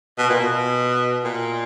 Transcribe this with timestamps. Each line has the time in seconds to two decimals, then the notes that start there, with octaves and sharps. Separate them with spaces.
0.18 B2
0.30 A#2
0.40 B2
1.25 A#2